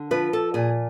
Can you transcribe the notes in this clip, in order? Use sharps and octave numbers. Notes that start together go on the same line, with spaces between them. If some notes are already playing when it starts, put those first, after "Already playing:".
Already playing: D3
F3 B4
A4
A#2 G#4